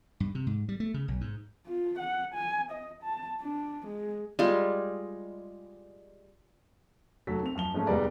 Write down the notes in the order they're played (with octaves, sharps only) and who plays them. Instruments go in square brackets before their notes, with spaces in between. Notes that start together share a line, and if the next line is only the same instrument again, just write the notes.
[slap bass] G2
C3
G#2
G3
A3
C#3
B1
G#2
[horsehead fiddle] F4
F#5
G#5
D#5
A5
D4
G#3
[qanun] G3 G#3 F4
[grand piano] F1 F#3 A4 B6
C4 F7
F#2 F3 F7 G7
G#2 F3 A3 C#4
F1 G3 G#3 B3 D5 A#5